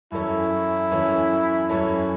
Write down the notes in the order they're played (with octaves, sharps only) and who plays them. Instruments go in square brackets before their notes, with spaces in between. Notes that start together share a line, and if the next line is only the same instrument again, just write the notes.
[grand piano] F#2 E3 C#4 A4 C#5 [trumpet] E4
[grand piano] F#2 E3 C#4 A4 C#5
F#2 E3 C#4 A4 C#5